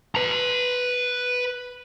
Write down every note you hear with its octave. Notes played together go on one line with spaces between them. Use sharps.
B4 A#5